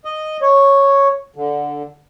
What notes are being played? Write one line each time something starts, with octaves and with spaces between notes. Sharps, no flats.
D#5
C#5
D3